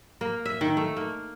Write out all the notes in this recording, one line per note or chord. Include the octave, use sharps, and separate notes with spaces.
A#3
E5
D#3
A3
A#3